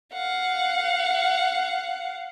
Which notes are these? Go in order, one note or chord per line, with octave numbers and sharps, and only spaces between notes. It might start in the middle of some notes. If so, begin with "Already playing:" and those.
F5 F#5